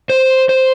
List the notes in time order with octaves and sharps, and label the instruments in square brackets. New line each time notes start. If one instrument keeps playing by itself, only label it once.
[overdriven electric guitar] C5
C5